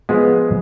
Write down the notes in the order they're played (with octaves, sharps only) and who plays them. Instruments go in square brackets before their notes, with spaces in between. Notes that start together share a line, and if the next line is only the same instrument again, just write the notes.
[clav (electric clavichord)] F3 G#3 B3 F4